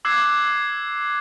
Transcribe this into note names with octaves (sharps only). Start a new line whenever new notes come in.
D6 E6 F#6 G#6 C7